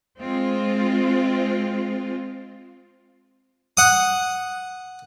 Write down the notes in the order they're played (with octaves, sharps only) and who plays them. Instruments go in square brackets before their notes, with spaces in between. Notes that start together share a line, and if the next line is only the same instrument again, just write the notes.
[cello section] G#3 C4 F4
[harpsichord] F#5 D#6